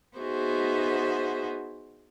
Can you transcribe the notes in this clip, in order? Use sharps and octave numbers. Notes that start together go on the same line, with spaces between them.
B3 D#4 F#4 G#4 C5 E5